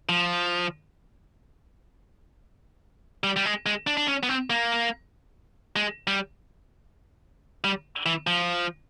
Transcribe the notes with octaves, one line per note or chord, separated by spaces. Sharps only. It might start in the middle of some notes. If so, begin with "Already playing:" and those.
F3
G3
G3
G#3
G#3
D4
D4
C#4
B3
C4
A#3
G#3
G3
G3
E3
F3